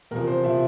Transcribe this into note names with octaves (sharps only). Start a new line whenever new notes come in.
E2 C3 F3 A#4
C5
C3 F3 E5